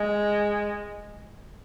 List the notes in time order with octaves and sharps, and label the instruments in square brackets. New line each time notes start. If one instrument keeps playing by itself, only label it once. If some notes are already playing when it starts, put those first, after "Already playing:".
Already playing: [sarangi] G#3